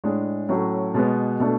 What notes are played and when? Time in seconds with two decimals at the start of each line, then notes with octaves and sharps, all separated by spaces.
0.04 A2 G#3 D4 G#4
0.49 A2 F#3 A3 C#4
0.94 B2 G#3 B3
1.40 B2 A3 D4